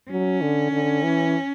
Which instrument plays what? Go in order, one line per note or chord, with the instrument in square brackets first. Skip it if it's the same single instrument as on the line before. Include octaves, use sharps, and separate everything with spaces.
[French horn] F#3 [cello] C#4
[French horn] D3
D3
E3